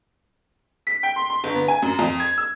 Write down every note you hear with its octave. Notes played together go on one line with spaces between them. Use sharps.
B6
G5
C6
C6
G1
B3
G#5
F#2
F2
G#6
E6